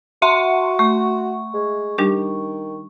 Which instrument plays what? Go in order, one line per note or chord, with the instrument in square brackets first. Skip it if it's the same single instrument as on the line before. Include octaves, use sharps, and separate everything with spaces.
[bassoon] F#4 [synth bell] E5 F#5 C6
[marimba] A3 [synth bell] C#6
[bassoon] G#3
[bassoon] D#3 [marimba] G3 D4 G4